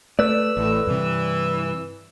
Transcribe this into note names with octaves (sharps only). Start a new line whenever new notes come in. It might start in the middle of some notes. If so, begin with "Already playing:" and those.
A3 B4 D5 E6
A1 A2
G2 C3 E3